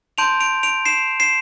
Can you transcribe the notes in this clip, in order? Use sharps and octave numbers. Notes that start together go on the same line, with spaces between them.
A5 C6 G6 D7 F7
D7 F7
D7 F7
C7 E7
C7 E7